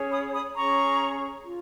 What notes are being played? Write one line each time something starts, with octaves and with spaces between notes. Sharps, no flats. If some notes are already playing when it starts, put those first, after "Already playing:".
Already playing: C#4 G#4 C#5
B5 D#6
B5 D#6
C#4 G#4 C#5 A#5 C#6
F4